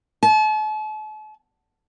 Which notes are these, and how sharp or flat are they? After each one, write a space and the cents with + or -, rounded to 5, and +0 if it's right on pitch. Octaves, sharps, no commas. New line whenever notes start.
A5 -40